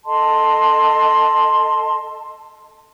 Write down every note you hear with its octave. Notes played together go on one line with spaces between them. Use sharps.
A4 D#5 A5 C6